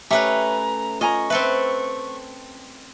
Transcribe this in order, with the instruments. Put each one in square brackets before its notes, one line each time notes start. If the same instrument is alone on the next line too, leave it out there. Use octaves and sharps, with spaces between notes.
[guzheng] A3 C#4 B4 [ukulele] G4 E5 G5 [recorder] A#5
[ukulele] F4 G#5 A#5 [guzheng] D#5 [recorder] C#6
[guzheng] C4 A4 B4 [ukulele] E5